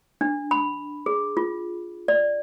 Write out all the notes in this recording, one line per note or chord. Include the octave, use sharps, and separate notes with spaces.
D4
B5
G#4
F4
D5